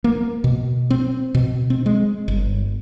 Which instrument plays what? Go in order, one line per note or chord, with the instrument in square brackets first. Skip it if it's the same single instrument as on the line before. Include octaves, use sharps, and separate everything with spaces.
[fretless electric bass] A#3
B2
C4
B2
C4
G#3
G1